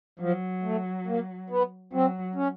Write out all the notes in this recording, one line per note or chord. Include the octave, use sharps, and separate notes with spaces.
F3 F#3
A3
A#3
B3
F#3 C4
C#4